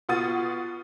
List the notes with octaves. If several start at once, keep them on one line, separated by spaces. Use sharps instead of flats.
B2 F4 F#5 D#6 A6 D#7